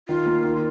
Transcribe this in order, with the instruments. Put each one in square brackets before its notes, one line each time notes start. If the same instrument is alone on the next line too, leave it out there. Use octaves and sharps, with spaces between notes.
[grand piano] D#3 [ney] F4
[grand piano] A#3
D#3